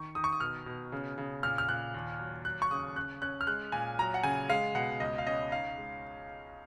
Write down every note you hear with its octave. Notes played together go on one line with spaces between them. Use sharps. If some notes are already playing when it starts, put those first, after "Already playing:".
Already playing: D#3 C#6
D#3 D#6
C#6
D#6
B2 F6
B2
C#3
C#3
A#2 F6
F6
A#2 F#6
D#2
F#3
F#3 F#6
C#6
C#3 D#6
C#4 F#6
C#4 F#6
F6
G#3 F#6
A#2 G#5
F#3 A#5
F#5
C#3 G#5
G#3 F5
B2 F#5
C#2 D#5
F5
C#4 D#5
D#4 F5
G#3